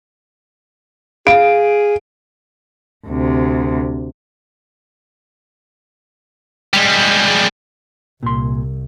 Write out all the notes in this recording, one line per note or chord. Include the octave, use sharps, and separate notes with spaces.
G#4 F5 D7
D2 C3
G3 G#3
C2 A#2 C6